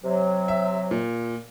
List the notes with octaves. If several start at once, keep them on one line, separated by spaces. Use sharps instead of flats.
C3 F#3
E5
A#2